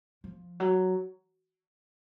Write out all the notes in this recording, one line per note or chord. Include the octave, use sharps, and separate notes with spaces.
F3
F#3